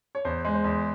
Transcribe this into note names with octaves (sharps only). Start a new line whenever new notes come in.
C#5
E2 C5
G#3
C5
E2